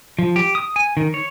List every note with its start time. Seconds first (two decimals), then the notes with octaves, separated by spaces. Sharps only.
0.19 F3
0.36 G4
0.55 D#6
0.76 G#5
0.97 D#3
1.14 C#5